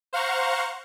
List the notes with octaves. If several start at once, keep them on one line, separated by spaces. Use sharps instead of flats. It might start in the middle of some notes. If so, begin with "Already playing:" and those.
C5 F5 F#5 A#5 C#6